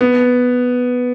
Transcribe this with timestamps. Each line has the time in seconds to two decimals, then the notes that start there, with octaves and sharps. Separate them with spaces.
0.01 B3